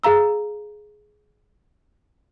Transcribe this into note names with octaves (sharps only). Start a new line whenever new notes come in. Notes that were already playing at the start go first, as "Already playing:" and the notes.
G#4 F5 A#5 E6